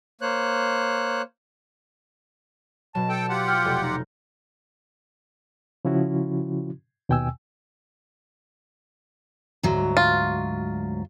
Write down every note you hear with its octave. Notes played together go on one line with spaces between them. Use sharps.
A#3 C5 C#5 F#6
B2 F#3 A5
A4 G5
F4 G4 F#5
G5 F6 F#6 C#7
F1
D#4
C#3 F3 C#4 E4 F#4
D#2 B2 G5 G#5 E6
D2 G#2 F#3
F4